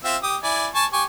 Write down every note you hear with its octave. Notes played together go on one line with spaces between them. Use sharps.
C4 F4 E5
G4 D#6
E4 D5 G#5
G#5 A5 C#6
G4 G#5 C#6